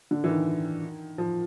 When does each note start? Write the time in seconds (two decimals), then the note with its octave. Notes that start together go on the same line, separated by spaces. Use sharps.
0.11 D3
0.24 E3
0.29 D#3
1.18 F3